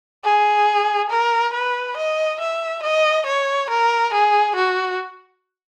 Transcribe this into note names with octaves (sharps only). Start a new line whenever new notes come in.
G#4
A#4
B4
D#5
E5
D#5
C#5
A#4
G#4
F#4